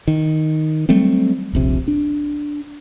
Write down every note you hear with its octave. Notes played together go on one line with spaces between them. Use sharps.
D#3
F#3 G3 A3 C4
D#1 A#1 C3
D4